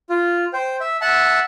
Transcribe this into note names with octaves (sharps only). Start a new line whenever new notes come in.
F4
C5 G5
E5
E5 F#5 A5